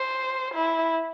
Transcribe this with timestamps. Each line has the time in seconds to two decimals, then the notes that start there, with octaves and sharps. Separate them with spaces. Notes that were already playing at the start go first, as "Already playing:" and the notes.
Already playing: C5
0.54 E4